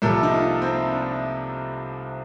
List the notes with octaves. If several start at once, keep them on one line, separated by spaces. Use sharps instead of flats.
C2 C3 F3 A#3 A4
D#4
F4
C4
D4